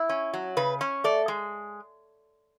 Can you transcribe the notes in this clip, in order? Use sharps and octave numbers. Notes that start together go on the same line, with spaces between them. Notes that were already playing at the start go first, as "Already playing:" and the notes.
Already playing: E4
C#4
F#3
C#3 B4
C#4
A3 D5
G#3